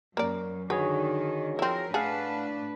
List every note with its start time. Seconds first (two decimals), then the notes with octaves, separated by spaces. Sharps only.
0.17 F#2 A#3 A#4 D5
0.70 D3 D#3 F#4 G#4 B4 C#5
1.59 F3 C4 E4 A#4
1.94 A2 D4 G#4 B4 F5 F#5 A5